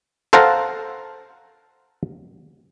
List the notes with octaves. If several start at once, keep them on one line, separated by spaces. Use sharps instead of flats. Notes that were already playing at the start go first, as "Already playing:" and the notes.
A4 C5 F5 F#5 A5 A#5